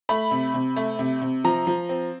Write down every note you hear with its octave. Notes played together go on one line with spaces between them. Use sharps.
A3 B5
C3
C3
A3
C3
C3
F3 A#5
F3
C4